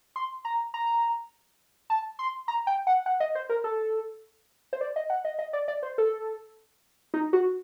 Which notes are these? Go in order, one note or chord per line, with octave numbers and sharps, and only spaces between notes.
C6
A#5
A#5
A5
C6
A#5
G5
F#5
F#5
D#5
C5
A#4
A4
C5
D5
D#5
F#5
D#5
D#5
D5
D5
C5
A4
D#4
F#4